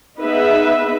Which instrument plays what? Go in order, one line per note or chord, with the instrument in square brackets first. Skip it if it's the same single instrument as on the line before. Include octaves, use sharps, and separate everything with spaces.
[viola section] B3 D#4 G#4 B4 E5